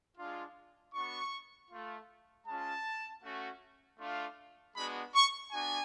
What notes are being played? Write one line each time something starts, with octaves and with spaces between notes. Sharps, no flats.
G#3 D4 F4
B3 D4 F#4 C#6
A3 F4
G#3 C#4 F4 A5
A3 C#4 F#4
A3 D4 F4
G#3 B3 D4 F#4 B5
C#6
B3 D4 F#4 G#5